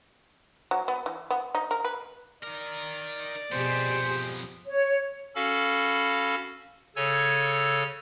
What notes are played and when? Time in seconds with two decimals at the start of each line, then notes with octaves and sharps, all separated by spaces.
0.71 F#3
0.88 B3
1.06 E3
1.30 B3
1.55 D#4
1.71 A#4
1.85 B4
2.43 D#4 A#4 D5
3.52 F2 B2 B3 G4 G#4 C5
4.66 C#5
5.35 C#4 F#4 A4 F5 B5
6.96 C#3 A4 C#5 G#5 E6 G#6